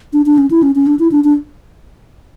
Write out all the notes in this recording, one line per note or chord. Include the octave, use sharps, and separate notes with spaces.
D4
D4
C#4
E4
C#4
C#4
D4
E4
D4
D4